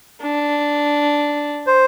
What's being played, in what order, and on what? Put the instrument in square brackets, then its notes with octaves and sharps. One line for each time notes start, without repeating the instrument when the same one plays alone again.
[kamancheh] D4
[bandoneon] C5